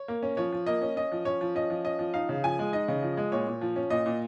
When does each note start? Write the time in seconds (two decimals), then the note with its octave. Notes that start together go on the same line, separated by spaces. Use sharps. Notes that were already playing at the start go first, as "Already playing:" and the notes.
Already playing: C#5
0.08 A#3
0.23 C#4
0.37 F3 C#5
0.52 F3
0.66 A#3 D#5
0.82 C#4
0.96 C#4 D#5
1.12 F3
1.25 C#4 C#5
1.41 F3
1.55 C#4 D#5
1.70 F3
1.85 C#4 D#5
1.99 F3
2.14 D#4 F5
2.29 C#3
2.44 F3 G#5
2.59 G#3
2.73 D#4 D#5
2.88 C#3
3.03 F3
3.17 G#3
3.32 A#2 C#5
3.47 A#2
3.61 F3
3.76 C#4
3.90 A#2 D#5
4.06 A#2